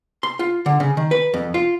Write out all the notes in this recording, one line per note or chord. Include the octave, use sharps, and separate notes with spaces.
C6
F4
D3
C#3
D#3
B4
F2
F4